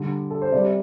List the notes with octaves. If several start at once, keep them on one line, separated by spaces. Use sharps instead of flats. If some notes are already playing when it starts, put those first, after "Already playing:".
Already playing: D3 G3
A4
C5
C3 G3 D5